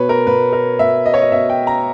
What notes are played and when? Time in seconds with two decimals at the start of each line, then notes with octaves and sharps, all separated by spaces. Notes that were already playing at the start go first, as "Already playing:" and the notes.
Already playing: B2 B4 C#5
0.09 A#4
0.27 B2 B4
0.53 A#4
0.79 B2 E5
1.06 D#5
1.14 C#5
1.22 D#5
1.32 B2 E5
1.50 G5
1.67 A#5